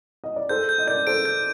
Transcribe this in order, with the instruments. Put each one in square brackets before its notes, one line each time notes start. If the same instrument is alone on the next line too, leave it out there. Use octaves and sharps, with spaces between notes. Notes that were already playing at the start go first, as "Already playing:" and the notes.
[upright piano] D#5
D5
[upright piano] A4 C5 [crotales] G6
[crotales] G6
[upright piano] D#5
[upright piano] A#4 D5 [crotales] G6
[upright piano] A4 C5 [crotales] D7
[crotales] G6